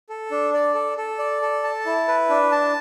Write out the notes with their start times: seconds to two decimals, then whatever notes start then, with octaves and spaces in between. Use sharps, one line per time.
0.09 A4
0.31 D4
0.53 D5
0.75 A4
0.97 A4
1.19 D5
1.42 A4
1.64 A5
1.86 E4
2.08 B4
2.30 D4
2.52 A5